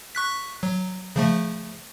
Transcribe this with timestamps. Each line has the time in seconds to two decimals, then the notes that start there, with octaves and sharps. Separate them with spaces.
0.15 C#6 F#6 B6
0.63 F#3
1.16 C#3 F3 A3